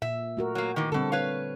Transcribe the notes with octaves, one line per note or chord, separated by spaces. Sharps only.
A#2 E5
A3 F#4 A#4
F#3 A#3
D#3 E3 A#3
B2 D3 G3 C4 A4
B4 C#5 F5